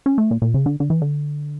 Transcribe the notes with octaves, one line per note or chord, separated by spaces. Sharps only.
C#4
A3
A#2
A#2
C#3
D3
D3
E3
D3